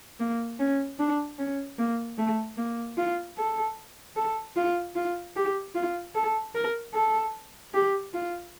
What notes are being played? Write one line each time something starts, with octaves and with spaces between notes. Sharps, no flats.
A#3
C#4
D4
C#4
A#3
A3
A#3
F4
A4
A4
F4
F4
G4
F4
A4
A#4
A4
G4
F4